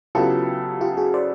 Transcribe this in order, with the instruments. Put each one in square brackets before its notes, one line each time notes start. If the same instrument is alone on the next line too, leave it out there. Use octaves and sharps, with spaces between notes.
[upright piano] C#3 F#3 B3 E4 A4 [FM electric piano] F4 G4
[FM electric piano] F4 G4
F#4 G#4
C5 D5